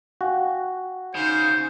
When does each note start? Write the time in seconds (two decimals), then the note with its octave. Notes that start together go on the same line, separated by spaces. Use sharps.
0.21 F#4 F5 G5 G#5
1.15 C#3 D#4 C5